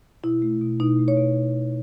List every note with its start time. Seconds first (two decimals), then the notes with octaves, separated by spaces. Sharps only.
0.23 B2 E4
0.42 A3
0.61 B2
0.80 B2 D#4
0.99 A3
1.08 C#5
1.17 B2